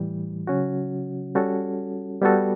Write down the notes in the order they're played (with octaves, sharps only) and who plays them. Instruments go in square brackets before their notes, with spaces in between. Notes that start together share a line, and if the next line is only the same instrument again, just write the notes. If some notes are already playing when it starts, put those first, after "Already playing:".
Already playing: [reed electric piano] A2 E3 G3
C#3 F#3 C#4 F#4
G3 C#4 F#4 A4
G3 B3 F#4 A4